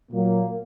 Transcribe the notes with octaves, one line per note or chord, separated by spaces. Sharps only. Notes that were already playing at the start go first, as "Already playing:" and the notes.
A#2 F#3 A#3